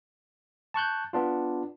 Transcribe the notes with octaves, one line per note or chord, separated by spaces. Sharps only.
A5 C#6 F#6 G6
B3 D4 F4